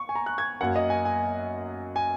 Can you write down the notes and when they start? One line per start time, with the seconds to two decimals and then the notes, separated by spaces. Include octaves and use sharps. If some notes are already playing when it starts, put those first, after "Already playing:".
Already playing: C#6
0.09 G#5
0.15 A#5
0.26 F#6
0.38 G#6
0.61 F#2 F#3 A#3 F#5
0.76 D#5
0.90 G#5
1.05 G#5
1.96 G#5